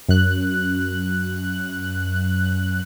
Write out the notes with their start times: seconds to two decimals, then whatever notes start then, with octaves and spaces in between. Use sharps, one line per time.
0.09 F#2 F#6